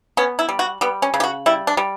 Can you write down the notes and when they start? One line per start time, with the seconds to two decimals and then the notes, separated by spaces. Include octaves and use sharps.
0.17 B3 C#4
0.39 E4
0.49 G3
0.59 F#4
0.81 G3 B3
1.02 C#4
1.14 C#3
1.20 G4
1.23 F#4
1.46 G3 E4
1.67 D4
1.77 G3